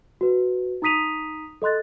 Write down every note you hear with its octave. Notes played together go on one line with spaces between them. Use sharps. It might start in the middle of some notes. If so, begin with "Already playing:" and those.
F#4 B4
D#4 A#5 D#6 B6 D#7 F7
A4 D#5 C6 F#6 A6